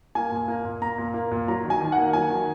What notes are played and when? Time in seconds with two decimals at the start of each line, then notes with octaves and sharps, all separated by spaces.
0.15 A#3 G#5
0.32 A#2
0.48 A#3
0.65 A#2
0.82 A#3 A#5
0.98 A#2
1.14 A#3
1.31 A#2
1.48 F#3 A#5
1.64 D#3
1.70 G#5
1.81 D#3
1.92 F#5
1.98 A#3
2.13 F#3 G#5
2.30 D#3